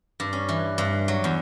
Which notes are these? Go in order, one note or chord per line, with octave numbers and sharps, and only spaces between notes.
G2
C#4
E3
G2
F#3
E2